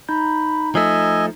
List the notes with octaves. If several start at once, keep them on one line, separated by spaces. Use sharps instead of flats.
D#4 A#5 B5 G6
F3 A3 D#5 G#5 E6